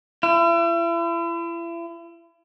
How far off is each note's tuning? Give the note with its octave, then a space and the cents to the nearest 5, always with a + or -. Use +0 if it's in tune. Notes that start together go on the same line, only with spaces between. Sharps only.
E4 +40